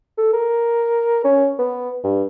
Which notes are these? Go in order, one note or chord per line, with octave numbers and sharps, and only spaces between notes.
A4
A#4
C#4
B3
G2